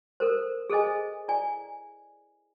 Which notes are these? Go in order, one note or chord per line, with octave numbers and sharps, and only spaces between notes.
A4 A#4 C5
G#4 A4 C5 D#5 G#5
E4 D5 G#5